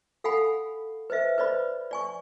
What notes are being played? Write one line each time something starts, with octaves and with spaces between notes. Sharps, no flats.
A4 F5 F#5 G#5 B5
B4 C5 D#5 E5
B4 C5 D5 D#5 B5
D5 G#5 C#6